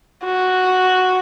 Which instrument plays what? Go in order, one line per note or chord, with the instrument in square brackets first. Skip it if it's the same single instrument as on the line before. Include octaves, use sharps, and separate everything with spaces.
[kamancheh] F#4